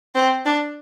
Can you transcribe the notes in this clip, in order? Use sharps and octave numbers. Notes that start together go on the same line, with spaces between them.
C4
D4